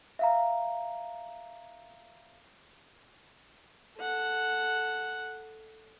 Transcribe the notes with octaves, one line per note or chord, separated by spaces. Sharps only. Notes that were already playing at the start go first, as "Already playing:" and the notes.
E5 F5 A#5
A4 F#5